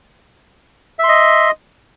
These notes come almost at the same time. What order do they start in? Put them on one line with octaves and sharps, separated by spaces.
E5 C6 D#5